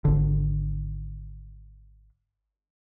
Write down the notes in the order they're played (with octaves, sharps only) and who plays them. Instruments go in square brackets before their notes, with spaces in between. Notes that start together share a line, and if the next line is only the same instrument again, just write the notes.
[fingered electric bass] G#1 D3